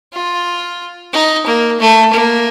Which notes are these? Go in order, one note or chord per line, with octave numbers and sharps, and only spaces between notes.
F4
D#4
A#3
A3
A#3